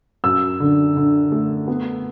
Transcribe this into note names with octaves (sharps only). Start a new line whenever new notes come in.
F#2 E6
D3
D3
A3
B3